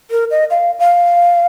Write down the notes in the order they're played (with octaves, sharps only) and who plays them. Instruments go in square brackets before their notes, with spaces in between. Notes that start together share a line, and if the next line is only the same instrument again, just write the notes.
[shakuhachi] A#4
D#5
F5
F5